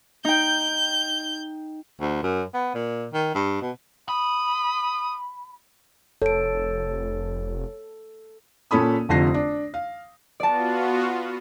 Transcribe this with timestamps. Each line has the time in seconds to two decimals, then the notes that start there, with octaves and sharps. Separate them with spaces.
0.25 D#4 G5 G6
2.01 D2
2.23 F#2
2.54 B3
2.74 A#2
3.13 D#3
3.35 G2
3.61 B2
4.09 B5 D#6
6.22 F1 A4 C#5 D7
8.71 A#2 C#4 A4 B5 D#6
9.09 F1 F2 D3 F4 A#6 C7
9.34 D4
9.74 F5
10.40 B3 F4 F#4 D5 A5